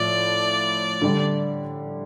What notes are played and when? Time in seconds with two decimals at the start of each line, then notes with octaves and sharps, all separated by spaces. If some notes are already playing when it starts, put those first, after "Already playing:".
Already playing: A2 F3 D5
1.02 D3 G3 D4